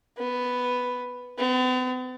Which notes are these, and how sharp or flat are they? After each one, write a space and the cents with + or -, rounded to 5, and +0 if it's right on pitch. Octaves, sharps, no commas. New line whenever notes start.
B3 +5
B3 +45